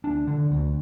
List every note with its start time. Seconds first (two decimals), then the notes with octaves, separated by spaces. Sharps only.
0.04 D2 D4
0.27 D3
0.51 D2